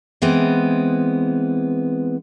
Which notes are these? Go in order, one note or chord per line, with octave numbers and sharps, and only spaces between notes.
E3 G#3 B3 C4